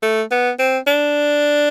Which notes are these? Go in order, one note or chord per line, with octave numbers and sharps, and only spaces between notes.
A3
B3
C4
D4